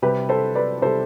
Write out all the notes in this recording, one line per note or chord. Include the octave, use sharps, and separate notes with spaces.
C3 G3 G4 B4
A4 C5
B4 D5
C3 G3 A4 C5